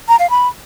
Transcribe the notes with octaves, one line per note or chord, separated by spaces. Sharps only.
A#5
F5
B5